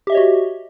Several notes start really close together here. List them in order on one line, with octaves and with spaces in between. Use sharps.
G4 E5 D#5 C#5 F#4